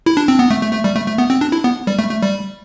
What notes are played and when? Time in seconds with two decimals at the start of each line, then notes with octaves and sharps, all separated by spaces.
0.06 E4
0.17 D4
0.28 C4
0.39 B3
0.51 A3
0.61 A3
0.73 A3
0.84 G3
0.96 A3
1.07 A3
1.18 B3
1.30 C4
1.41 D4
1.52 E4
1.64 B3
1.87 G3
1.99 A3
2.10 A3
2.22 G3